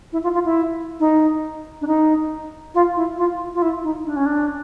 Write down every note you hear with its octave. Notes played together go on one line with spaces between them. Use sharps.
E4
F4
F4
E4
D#4
D4
D#4
F4
E4
F4
F4
E4
D#4
D4
C#4
D4